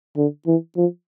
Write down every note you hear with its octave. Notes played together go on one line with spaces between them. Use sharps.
D3
E3
F3